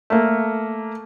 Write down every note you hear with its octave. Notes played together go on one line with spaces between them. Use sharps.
A3 A#3